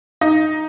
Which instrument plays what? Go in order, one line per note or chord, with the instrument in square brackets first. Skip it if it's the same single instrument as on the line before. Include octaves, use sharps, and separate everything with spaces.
[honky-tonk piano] D#4